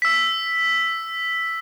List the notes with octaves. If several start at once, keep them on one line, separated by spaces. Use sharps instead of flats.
E6 B6